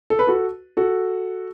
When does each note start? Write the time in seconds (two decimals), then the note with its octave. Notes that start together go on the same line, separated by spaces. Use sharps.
0.10 A4
0.19 B4
0.27 F#4 A4
0.77 F#4 A4